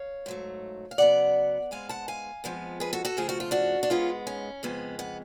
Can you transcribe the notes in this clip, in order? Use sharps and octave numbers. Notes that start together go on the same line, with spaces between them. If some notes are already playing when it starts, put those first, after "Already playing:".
Already playing: C#5 F5
G#2 F#3 A3
F5
C#3 F#3 B3 D5 F#5
G#2 G#3 B3 F5 G#5
F#5 A5
F5 G#5
F2 F3 G#3 B3
G#4 B4
F#4 A4
F#4 A4
C#3 F3 A3 G#4
F#4
F4
D4 F#4
D4
G#2 G#3 B3 C#4 F4
C#4
F2 C#3 G#3 B3
B3